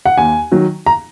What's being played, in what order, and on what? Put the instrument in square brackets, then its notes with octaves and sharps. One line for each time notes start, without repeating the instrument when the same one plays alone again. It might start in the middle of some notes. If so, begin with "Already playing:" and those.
[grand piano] F#5
D#2 G#5
D#3 F#3
A#5